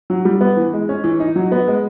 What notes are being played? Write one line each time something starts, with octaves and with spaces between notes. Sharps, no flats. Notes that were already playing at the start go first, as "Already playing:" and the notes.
F#3
G3
B3
E3
G#3
C#4
E3
D#4
F#3
B3
G#3